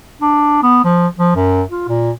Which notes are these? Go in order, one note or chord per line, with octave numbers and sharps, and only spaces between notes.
D4
B3
F3
F3
F#2
F4
A#2